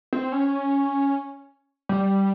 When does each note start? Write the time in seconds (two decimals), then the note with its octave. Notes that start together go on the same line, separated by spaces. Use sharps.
0.13 C4
0.32 C#4
1.89 G3